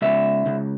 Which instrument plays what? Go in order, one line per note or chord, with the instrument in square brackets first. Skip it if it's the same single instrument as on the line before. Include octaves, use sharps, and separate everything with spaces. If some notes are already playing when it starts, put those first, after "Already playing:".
[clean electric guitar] C#2 E5
C#2